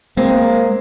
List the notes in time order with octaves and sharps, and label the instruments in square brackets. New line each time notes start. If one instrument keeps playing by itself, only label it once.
[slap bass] G#3 [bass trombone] A#3 [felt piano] C4